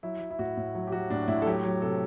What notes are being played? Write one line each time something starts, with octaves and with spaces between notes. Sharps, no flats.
F#3 E4
F#3
E4
A2 F#4
A2
F#3
G4
F#3 F#4
A2 D4
A2 E4
A4
F#3 G4
F#3
C3 A4